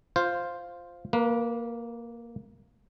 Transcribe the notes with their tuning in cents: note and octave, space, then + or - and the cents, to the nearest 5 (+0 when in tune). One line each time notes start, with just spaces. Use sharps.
F4 +0 C5 +0
A#3 +0 B4 -30